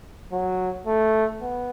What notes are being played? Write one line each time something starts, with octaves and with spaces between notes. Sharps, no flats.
F#3
A3
B3